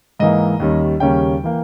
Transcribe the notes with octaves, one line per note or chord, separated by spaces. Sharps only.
G#2 E3 A#3 D#5
D#2 D#3 G3 C#4
D#2 C#3 G3 A#3 C#4 G5
E3 A#3